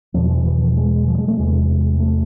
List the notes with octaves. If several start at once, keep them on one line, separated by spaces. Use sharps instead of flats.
E2 B2 F3
E3
E3
F3
G#3
F3
G#3
A3
E2 C3 G#3
A3